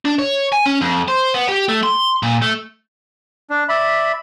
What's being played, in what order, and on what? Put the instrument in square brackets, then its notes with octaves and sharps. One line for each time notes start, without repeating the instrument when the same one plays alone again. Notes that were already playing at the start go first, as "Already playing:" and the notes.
[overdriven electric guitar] D4
C#5
G#5
C#4
F2
C5
B3
G4
A3
C6
A#2
A3
[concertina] D4
D5 E5 B5